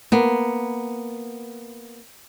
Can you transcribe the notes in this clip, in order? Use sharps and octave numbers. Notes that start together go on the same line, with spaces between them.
A#3 B3